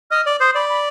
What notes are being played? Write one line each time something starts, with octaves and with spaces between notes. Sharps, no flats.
D#5 F6
D5
C5 D#6
D5 B5
B5